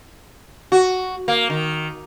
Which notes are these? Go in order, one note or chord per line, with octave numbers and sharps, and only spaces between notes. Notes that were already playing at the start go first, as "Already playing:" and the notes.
F#4
A#3
D#3